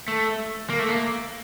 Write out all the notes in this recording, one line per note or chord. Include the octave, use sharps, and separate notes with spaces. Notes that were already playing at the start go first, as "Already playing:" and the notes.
A3
A#3
A3
A#3